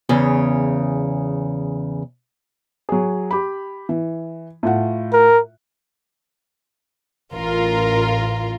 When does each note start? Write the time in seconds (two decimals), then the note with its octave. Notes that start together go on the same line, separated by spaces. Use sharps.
0.09 E2 C#3 C#5
2.89 F#3 G#4
3.31 G4 B5
3.89 E3
4.63 A2 F4 F#5
5.13 A#4
7.33 A1 F4 A#4